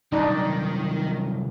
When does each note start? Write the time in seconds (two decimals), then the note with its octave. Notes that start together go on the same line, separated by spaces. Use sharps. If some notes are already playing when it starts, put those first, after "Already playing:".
0.12 C2 F#2 D#3 D4 D#4